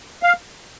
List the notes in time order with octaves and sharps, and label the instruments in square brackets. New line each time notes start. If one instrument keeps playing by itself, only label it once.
[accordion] F5